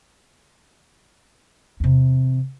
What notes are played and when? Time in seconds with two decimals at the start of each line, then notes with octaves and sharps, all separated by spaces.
1.80 E2 C3